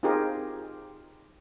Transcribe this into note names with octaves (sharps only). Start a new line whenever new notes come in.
C4 D#4 F4 G4 G#4 A#4